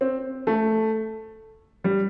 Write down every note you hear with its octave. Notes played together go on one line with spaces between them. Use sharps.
C4
A3
G3